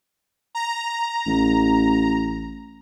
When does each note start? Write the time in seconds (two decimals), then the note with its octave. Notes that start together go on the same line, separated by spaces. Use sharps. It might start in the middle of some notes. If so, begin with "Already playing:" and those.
0.55 A#5
1.26 A1